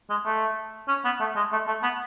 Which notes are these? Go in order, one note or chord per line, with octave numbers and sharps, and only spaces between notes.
G#3
A3
C#4
B3
A3
G#3
A3
A3
B3